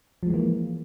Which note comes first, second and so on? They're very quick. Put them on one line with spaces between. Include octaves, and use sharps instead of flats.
F3 G#3 E3 A#3